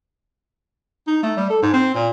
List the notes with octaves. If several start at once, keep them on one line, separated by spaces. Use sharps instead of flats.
D#4
A3
G3
A4
G#2
C4
A#2